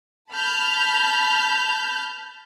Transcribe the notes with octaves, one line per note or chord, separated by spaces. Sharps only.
A5 B5 F6 G6